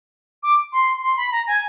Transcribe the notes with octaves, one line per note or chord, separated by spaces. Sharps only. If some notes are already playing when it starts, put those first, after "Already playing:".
D6
C6
C6
B5
A#5
G#5